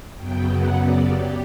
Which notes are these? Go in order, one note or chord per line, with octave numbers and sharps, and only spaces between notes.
F#2 C#3 F#3 B3 G5
F#5
D5
G4